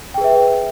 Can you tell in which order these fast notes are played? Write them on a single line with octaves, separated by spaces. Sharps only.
G5 G#4 B4 E5